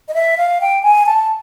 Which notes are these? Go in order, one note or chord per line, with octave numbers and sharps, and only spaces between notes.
D#5
E5
F5
G5
G#5
A5